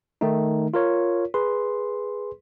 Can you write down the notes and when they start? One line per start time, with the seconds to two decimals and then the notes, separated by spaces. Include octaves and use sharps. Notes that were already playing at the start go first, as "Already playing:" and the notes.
0.21 D#3 A3 D#4
0.74 F4 A#4 C#5
1.34 G#4 B4 C6